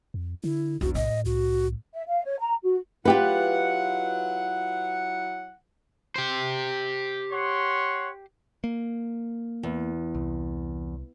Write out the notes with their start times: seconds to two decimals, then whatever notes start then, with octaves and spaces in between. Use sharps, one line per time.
0.14 F2
0.44 D3 E4
0.81 B1 E2 D3 F#4
0.95 A2 D#5
1.26 C2 F#4
1.94 E5
2.07 F5
2.25 C#5
2.40 A#5
2.64 F#4
3.05 F#3 E4 F4 G4 B4 F#5
6.16 G4 C5
7.31 C#5 F#5 C6
8.64 A#3
9.63 E2
10.15 C2